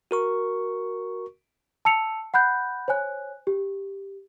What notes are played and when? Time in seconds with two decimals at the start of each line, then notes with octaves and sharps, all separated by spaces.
0.11 F#4 A#4 C#6
1.85 A5 E6 C#7 F7
2.34 F#5 B5 F#6 G6
2.88 C5 C#5 G#5 F#6
3.47 G4